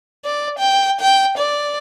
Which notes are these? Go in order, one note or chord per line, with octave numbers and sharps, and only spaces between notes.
D5
G5
G5
D5